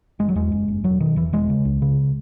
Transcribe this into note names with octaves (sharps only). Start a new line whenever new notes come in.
F#1 G#3
F#3
E2 G#3
F#1
F#1
E1 F#3
B2 D#3
E1 E3
E1 G#3
C#3
C#2
C#3